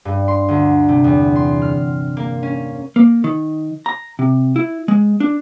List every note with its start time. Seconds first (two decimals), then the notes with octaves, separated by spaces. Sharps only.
0.05 G2
0.28 C6
0.48 D2
0.89 C3
1.04 E2
1.36 C6
1.62 F6
2.17 A#3
2.43 C#4
2.96 A#3
3.24 D#3
3.86 A#5
4.19 C3
4.56 E4
4.88 G#3
5.20 D4